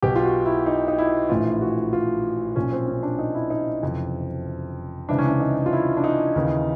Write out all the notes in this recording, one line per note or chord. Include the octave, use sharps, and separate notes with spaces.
B1 B2 G4
F4
F#4
E4
D#4
D#4
E4
A#1 A2 E3 F4
F#4
F4
B1 A#2 F3 C#4
C4
C#4
D4
D#4
E4
D#4
F#1 F2 C3 E3
C#2 C3 E3 D4
C#4
D4
D#4
F4
E4
D4
D#4
D#2 C#3 E3